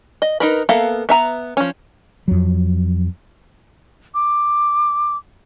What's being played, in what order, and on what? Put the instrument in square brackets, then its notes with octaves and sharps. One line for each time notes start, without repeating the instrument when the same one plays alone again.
[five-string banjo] D#5
D#4 A#4 B4
A#3 B3 A4 E5 F5
B3 E5 A#5
F3 C#4
[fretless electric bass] F2 F#3
[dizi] D6